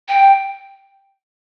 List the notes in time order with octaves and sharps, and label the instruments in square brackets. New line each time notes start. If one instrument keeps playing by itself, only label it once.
[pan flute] G5